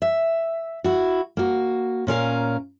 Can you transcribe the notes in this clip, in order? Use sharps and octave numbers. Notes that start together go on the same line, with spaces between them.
E5
E4 F#4
A#3 F#4
A#2 C#4 A#4 F5